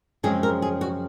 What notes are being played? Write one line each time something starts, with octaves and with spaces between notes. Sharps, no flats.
F#2 C#3 F3 G#3 C4 G#4
A#4
G#4
F#4